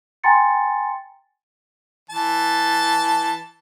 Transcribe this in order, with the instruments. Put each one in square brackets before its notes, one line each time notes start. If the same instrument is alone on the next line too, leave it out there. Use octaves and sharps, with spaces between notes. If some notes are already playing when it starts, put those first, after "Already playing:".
[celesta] G5 G#5 A#5 C6 A6 C#7
[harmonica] E3 A5